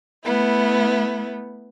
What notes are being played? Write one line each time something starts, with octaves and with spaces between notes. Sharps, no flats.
A3 B3 E4